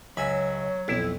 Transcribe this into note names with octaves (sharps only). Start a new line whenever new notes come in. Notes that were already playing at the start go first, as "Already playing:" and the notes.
C#2 F#3 C#5 E5 G#5 B5
B1 F2 E4